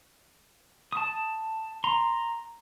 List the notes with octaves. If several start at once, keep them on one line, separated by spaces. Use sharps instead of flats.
A5 D#6
A#5 C6